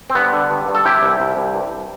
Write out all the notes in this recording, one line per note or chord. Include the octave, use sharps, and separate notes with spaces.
C4
G2 B3
D3
G2
G2
A4
C3 E4 G4
C2
C2
C2
G2